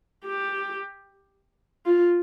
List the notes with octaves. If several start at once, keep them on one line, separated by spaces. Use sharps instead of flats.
G4
F4